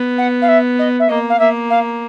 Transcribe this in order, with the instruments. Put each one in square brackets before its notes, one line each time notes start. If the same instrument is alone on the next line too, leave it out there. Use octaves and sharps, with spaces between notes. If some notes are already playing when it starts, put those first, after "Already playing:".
Already playing: [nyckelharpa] B3
[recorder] F#5
F5
E5
D#5
E5
[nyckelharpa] A#3 [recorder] D#5
[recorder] F5
[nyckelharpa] A#3 [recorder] E5
[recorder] F5